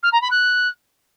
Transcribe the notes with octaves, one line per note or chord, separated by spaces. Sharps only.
F6
A#5
B5
F#6